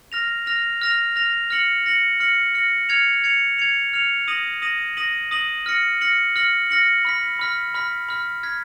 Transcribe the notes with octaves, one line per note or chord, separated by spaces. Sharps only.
F6 A#6 F7
F6 A#6 F7
F6 A#6 F7
F6 A#6 F7
F6 A#6 C#7 F#7
F6 A#6 C#7 F#7
F6 A#6 C#7 F#7
F6 A#6 C#7 F#7
F6 G#6 C#7 F7
F6 G#6 C#7 F7
F6 G#6 C#7 F7
F6 G#6 C#7 F7
D#6 A#6 D#7 F#7
D#6 A#6 D#7 F#7
D#6 A#6 D#7 F#7
D#6 A#6 D#7 F#7
F6 A#6 C#7 F#7
F6 A#6 C#7 F#7
F6 A#6 C#7 F#7
F6 A#6 C#7 F#7
B5 F6 B6
B5 F6 B6
B5 F6 B6
B5 F6 B6
F6 G#6 B6